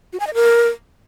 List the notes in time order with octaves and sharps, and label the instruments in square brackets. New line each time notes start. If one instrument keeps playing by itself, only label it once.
[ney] F#4
G#5
D#5
A#4